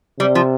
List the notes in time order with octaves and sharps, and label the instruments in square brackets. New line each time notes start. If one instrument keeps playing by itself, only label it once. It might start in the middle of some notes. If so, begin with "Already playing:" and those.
[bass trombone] C3 [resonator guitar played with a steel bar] G3
[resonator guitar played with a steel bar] F3